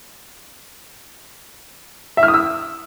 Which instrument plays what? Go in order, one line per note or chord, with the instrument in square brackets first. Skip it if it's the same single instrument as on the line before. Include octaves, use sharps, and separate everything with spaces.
[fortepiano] E5
F6
D#6
E6